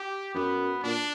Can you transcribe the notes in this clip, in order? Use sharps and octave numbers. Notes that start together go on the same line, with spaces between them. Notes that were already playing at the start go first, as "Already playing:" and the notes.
Already playing: G4
F#2 B3
A#2 D4